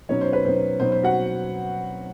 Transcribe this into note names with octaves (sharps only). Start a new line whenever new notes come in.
B2 F#3 B3 C#4 D#4 C#5
C5
B4
B2 F#3 B3 D#4 C5
B2 F#3 B3 D#4 C5
C5
F#4 F#5